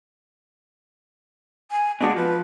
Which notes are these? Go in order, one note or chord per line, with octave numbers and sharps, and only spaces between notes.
G#5
B2 G#3 D4 F#4
F3 B4